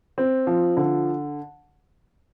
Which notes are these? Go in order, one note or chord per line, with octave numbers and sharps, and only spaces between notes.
C4
F3
D3